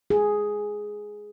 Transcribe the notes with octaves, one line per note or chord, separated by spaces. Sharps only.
G#4